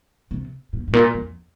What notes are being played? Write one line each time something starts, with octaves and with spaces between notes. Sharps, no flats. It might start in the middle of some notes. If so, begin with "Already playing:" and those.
C3
A#2
G#2
A#2
F2